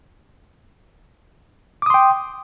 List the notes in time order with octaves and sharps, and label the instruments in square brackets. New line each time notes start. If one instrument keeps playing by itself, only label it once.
[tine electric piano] D6
D#6
C6
G5